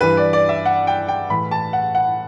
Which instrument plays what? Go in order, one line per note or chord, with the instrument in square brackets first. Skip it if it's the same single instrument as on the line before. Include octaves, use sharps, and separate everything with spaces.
[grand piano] G2 E3 B4
D5
D5
E5
F#5
G5
G5
A2 E3 B5
A5
F#5
F#5